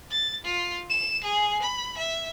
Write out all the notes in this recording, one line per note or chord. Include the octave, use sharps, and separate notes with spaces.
A6
F4
E7
G#4
B5
E5